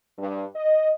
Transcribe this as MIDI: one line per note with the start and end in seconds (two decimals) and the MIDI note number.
0.19 0.45 43
0.55 0.91 75